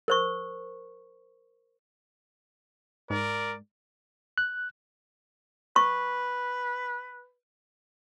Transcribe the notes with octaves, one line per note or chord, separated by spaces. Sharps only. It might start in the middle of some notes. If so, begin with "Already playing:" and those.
A#4 C5 C#6
G#2 A#4 D5
F#6
B4 C#6